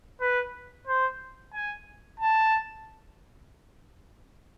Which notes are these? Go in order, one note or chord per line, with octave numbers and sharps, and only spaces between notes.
B4
C5
G#5
A5